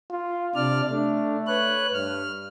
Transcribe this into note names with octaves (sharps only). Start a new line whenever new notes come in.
F4
C3 D4 D5 F6
A3 D4
B4 C#5 F#6
G2 F6